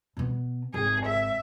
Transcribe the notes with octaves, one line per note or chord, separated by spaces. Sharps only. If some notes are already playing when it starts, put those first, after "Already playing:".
B2 B3
G#1 G#4
E5